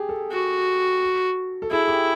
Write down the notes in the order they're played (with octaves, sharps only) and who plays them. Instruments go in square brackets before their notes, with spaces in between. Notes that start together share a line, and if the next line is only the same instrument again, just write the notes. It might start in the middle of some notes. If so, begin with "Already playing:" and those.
Already playing: [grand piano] G4 G#4
A4
[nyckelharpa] F#4
[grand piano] A4
[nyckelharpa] E4 [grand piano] G#4
[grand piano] G4